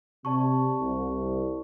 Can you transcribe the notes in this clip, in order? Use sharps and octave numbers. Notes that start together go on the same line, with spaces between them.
C3 D5 A5 C#6
C2